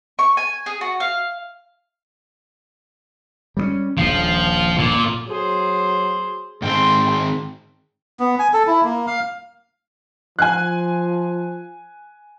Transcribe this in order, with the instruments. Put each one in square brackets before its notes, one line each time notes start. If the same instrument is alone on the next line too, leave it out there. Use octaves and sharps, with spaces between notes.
[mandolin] C#6
G#5
G#4
F#4
F5
[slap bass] G3 G#3 C#4
[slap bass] D#1 A#1 [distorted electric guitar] F3
[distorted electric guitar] A#2
[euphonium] F#3 [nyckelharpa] G#4 C5
[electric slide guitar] G#2 D#3 C4 [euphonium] G#4 [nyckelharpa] G5 C6
[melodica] B3
G#5
A4
E4
A#3
F5
[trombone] F3 [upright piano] G#5 F#6